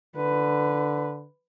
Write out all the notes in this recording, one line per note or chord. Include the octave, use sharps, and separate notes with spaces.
D3 B4